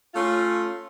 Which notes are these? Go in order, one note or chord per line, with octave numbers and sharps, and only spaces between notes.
A3 C#4 F4